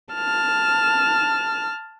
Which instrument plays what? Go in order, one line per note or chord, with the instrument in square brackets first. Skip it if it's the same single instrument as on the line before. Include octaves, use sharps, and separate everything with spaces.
[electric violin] A5 F6